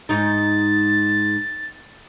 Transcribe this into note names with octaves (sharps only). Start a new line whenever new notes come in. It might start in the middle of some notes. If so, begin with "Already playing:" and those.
G#2 D#4 A6